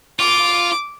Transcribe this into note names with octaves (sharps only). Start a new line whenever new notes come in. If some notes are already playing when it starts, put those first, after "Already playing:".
F4 D6